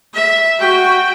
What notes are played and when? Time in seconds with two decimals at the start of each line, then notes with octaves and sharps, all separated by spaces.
0.14 E5
0.59 F#4 G5